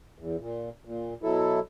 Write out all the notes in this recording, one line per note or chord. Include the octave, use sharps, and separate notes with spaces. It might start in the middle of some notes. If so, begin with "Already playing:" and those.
E2
A#2
A#2
B2 F#3 E4 A4